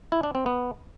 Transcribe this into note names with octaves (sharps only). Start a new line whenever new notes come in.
E4
D4
C4
B3